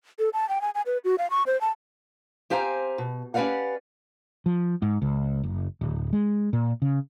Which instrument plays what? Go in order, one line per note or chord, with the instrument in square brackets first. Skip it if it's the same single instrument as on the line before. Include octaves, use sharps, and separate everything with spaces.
[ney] A4
A5
G5
G#5
G#5
B4
F#4
F5
C#6
C5
A5
[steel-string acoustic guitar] C4 G4 C5 F5 G#5 A#5
B2
C#4 G4 B4 D5 F5 F#5
[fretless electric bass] F3
G#2
C#2
F#1
D1
G#3
A#2
C#3